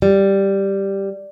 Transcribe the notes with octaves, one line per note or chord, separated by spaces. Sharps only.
G3